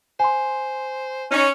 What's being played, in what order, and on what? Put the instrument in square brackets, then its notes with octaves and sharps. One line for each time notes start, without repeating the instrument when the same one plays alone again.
[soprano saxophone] C5 [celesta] G#5 C6
[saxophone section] C#4 [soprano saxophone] D#4